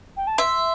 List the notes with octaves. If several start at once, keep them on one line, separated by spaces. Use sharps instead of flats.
G5
A5
E5 C6